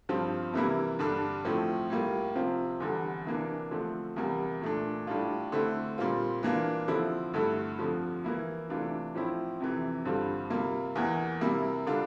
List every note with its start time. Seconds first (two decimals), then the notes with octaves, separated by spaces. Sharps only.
0.09 G2 F3 C4 F4
0.54 C3 E3 G3 A#3 E4
0.99 G2 D3 G3 D4
1.45 A2 F3 A3 C4
1.90 A2 G3 A#3 F4
2.35 C3 F3 C4 F4
2.80 E2 D3 G3
3.26 C3 E3 A#3 D4
3.71 D3 F3 A3 C4
4.16 E2 C3 G3 A#3
4.62 A#2 A3 D4
5.07 A2 G3 D4 F4
5.52 D3 A3 C4 E4
5.98 A#2 G3 C4 F4
6.43 E3 A#3 D4 F4
6.88 D3 F3 C4 E4
7.34 G2 D3 A3 E4
7.79 F2 D3 F3
8.24 E3 A#3 E4
8.69 C3 E3 A3 D4 F4
9.15 A2 F3 C4 E4
9.60 F2 C3 E3
10.05 G2 D3 G3 C4 F4
10.50 C3 G3 A#3 F4
10.96 E2 E3 A#3
11.41 C3 G3 A#3 E4
11.86 D3 G3 D4 F4